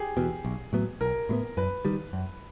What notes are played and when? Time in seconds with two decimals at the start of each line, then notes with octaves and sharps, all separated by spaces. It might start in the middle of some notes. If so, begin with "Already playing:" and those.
Already playing: G4 G#4
0.17 E2 B2
0.45 B1
0.73 A2 F#3 B3
1.01 B1 A#4
1.29 A2 F#3 B3
1.57 F#2 B4
1.85 D#3 G3
2.13 F#2